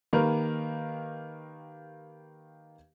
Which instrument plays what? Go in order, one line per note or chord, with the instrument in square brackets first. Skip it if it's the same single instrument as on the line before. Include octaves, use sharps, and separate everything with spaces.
[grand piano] D#3 A#3 G4 A#4 B4